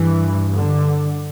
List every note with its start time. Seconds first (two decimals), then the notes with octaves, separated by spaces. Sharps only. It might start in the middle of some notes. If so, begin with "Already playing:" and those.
Already playing: G2 E3
0.55 D3